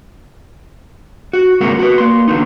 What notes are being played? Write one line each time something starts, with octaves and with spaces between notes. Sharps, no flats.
F#4
D2 G2 C3 G#3 A#3 F#5
F#4 B4
A#3 C6
E2 D3 B3 D#4